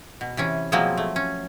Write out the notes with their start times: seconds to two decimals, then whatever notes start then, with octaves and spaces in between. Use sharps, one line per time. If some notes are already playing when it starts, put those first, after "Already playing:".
0.21 B2
0.37 C3 E3 C#4
0.72 B2 F3 F#3 G#3 A#3 C4
0.97 A3
1.16 C#4